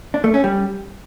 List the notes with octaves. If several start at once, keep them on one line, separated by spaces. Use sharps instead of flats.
D4
A3
C#4
G3